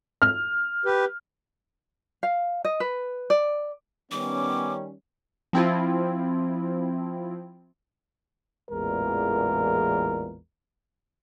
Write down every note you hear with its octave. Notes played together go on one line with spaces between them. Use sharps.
F6
G4 B4
F5
D#5
B4
D5
D#3 G3 B3 C#4 D6
F3 C4 E4 F4
A1 E2 A#2 G#3 A#4